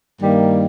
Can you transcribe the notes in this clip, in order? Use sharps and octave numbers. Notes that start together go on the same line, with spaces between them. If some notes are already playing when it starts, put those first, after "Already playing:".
G2 D#3 G3 A#3